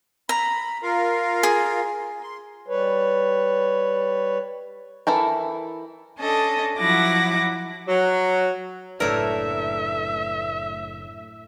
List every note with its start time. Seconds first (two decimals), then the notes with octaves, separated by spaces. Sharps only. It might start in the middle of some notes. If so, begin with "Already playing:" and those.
0.29 A#5 B5
0.83 F4 A#4 F5
1.43 G#4
2.23 C6
2.68 G3 B4 C#5
5.07 E3 E4 A4 A#4
6.18 C#4 D4 A4 D#5
6.78 F3 F#3 E4 F#5 D6 A#6
7.88 F#3
9.00 F#1 A2 A3 D4 A#4 B4 D5 E5